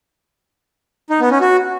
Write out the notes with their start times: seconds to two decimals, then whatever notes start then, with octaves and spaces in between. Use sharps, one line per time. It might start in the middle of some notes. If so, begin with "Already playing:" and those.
1.10 D#4
1.20 B3
1.30 C#4
1.41 F#4